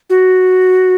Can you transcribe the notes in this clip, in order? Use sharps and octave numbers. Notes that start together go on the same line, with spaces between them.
F#4